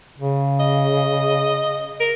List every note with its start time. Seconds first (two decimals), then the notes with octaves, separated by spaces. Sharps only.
0.18 C#3
0.60 D#5
2.00 A#4